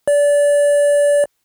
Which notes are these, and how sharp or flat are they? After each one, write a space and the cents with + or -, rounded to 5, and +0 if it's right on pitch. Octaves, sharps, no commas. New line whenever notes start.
D5 -25